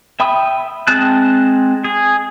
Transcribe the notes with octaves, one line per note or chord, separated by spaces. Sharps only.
E5 G5 B5 D#6
G#3 C4 A5 F#6
G#4